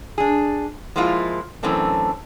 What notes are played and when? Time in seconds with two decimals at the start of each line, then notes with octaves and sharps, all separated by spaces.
0.18 D4 G#4
0.96 F3 G#3 A#3 E4 F4
1.63 F#2 E3 A3 C4 D4